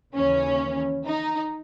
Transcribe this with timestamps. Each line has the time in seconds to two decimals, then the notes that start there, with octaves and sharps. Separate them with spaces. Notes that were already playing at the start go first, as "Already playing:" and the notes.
0.14 D#2 C#3 E3 C#4
1.06 D#4